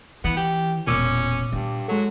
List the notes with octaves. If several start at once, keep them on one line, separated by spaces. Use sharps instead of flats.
E3 B3
G4
E1 A#2 C#4 D6 E6
G2 D4
F#3 G#3 A4